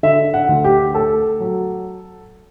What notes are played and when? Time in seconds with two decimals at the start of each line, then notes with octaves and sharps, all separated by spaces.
0.03 D3 E5
0.34 F#5
0.49 D2
0.64 G4
0.95 A3 A4
1.40 F#3